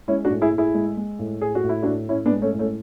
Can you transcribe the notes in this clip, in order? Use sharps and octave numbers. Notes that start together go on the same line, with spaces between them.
G#3 C#4 E4
D4 F#4
A2
E4 G#4
A2
E4 G#4
G#3
G#3
A2
A2 G#4
F#4
A2
E4
D4 F#4
A2
A2 C#4 E4
B3 D4
G#3
A3 C#4
A2
A3 C#4